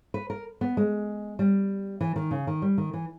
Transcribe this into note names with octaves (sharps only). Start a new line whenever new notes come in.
B4
A#4
B3
G#3
G3
E3
D#3
C#3
D#3
G3
D#3
E3